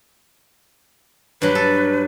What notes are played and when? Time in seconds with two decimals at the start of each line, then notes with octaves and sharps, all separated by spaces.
1.42 G2 F#3 B4
1.55 A4